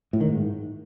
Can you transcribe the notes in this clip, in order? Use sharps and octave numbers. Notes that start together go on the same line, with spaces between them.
A2
D#3
G#2